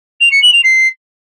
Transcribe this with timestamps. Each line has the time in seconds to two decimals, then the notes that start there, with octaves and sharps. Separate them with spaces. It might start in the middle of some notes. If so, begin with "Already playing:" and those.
0.20 F7
0.31 C#7
0.42 F#7
0.53 F7
0.63 C7